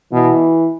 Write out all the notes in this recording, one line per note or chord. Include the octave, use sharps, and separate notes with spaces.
B2 E3